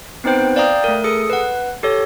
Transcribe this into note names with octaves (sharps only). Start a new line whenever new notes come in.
B3 C4 D#4 B4 C5 G5
D5 F5 G5 A#5 D#6 G6
A3 A#4
G#4 A4 D#6 C#7
B4 F#5
G4 A4 C#5